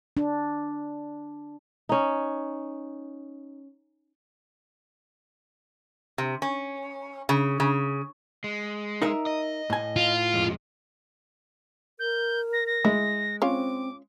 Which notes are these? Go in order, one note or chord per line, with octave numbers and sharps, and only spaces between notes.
D4
C#4 D#4
C3
C#4
C#3
C#3
G#3
D#4 A#4 E5
D#5
A2 G#5
F4
F2 G#3
A#4 G6
A#6
A#6
G#3 E4
C4 C#4 F4 C#5 D6